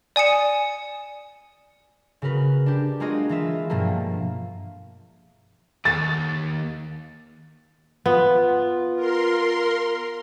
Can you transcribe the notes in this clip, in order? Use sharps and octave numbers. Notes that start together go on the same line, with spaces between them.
D5 G#5 D#6 C#7 E7
C#3 F#4 A#4 B4
D4 G4
G#3 A#3 F4 F#4 G#4 D#5
E3 F4 E5
G2 B2 F3 A3 A#3
D#2 A6
B3 F4
A#4 C6